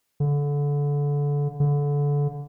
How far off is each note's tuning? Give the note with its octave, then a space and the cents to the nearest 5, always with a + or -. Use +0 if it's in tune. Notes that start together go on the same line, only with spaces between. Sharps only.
D3 -25
D3 -25